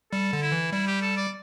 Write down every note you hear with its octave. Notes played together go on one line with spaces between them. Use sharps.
G3 A4
D3
E4
E3
G3 E4
G4
A4
D5